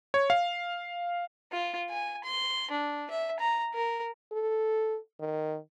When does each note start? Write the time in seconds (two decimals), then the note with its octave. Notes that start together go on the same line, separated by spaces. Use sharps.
0.14 C#5
0.30 F5
1.52 F4
1.90 G#5
2.24 C6
2.71 D4
3.10 E5
3.40 A#5
3.74 A#4
4.32 A4
5.20 D#3